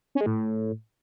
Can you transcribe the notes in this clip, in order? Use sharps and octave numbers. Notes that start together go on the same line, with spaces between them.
C#4
G#3
A2